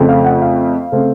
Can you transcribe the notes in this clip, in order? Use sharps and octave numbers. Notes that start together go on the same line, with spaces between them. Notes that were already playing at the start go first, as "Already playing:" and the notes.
Already playing: F2 C#3 A3 C4
F5
F#5
F5
C#3 A3 C4